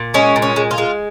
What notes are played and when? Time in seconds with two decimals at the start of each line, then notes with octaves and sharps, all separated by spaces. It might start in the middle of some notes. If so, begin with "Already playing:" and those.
Already playing: A#2
0.14 G#3 C#4
0.36 A#2
0.42 C#4
0.56 G#3
0.71 F4
0.78 G#3